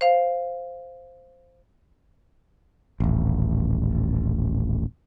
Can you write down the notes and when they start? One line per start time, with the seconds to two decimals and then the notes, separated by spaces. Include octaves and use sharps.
0.01 C5 F5
3.00 D#1 A1